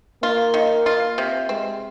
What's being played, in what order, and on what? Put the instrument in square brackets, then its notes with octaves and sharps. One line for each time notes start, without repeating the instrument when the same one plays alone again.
[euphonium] A#3 [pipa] F4
[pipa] D#3
F4
C3
[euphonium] G#3 [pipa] C4